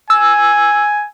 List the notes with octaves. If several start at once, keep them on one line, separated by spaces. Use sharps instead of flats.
G#5 E6